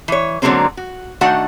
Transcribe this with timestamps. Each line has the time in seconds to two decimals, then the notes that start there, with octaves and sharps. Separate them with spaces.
0.08 E3 C#5
0.42 D3 F#3 G#3 A#3 C4 C#4
0.77 F#4
1.21 D#3 A3 D4 F#4 F#5